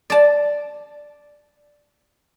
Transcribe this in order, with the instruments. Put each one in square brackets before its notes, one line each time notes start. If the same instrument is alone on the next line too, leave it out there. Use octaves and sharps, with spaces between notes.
[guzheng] D5 A5